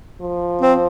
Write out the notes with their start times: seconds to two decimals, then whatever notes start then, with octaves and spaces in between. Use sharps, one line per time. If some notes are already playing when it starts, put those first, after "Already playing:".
0.21 F3
0.62 C4